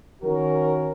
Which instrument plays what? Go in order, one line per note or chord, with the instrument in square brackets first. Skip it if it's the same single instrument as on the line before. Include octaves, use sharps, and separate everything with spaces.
[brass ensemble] D#3 C#4 F#4 A#4